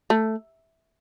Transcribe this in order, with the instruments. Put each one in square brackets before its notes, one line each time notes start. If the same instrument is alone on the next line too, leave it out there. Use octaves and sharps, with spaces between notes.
[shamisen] A3